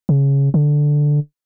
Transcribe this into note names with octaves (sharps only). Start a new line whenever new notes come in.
C#3
D3